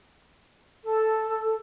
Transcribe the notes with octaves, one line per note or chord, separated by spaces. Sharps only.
A4